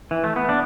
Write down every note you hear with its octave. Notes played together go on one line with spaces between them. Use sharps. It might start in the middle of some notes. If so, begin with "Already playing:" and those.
E3
A3
B3
D4